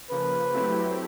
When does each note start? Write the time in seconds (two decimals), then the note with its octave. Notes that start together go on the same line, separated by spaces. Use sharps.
0.10 C#3 F3 A#3 B4
0.53 F#3 A3 C4 E4 G4